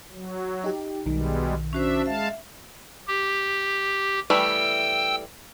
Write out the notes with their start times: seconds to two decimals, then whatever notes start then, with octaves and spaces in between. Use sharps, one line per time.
0.12 F#3
0.64 D#4 G4
1.06 B1 B2 D#3 G3 G#3
1.73 C#4 D4 F#4 C5 E5
2.06 G#3 E5 F5 A5
3.07 G4
4.30 E3 G3 A3 G5 E6